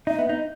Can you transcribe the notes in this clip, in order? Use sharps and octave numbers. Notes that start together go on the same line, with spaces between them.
D#4 E5
B3
D#4